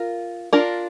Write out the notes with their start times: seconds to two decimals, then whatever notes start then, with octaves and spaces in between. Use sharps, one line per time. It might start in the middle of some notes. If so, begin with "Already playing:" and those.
Already playing: F4 A#4
0.53 D4 F4 A#4